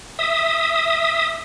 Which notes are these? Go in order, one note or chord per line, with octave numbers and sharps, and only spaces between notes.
E5 D#6